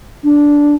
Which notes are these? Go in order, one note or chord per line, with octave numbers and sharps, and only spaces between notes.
D4